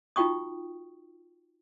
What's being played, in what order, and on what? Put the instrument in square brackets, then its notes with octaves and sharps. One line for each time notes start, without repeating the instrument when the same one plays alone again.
[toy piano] D#4 F4 F#4 G5 C#6 D#6